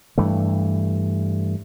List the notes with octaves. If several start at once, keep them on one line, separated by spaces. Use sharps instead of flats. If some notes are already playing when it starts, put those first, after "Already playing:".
G2 E3 A3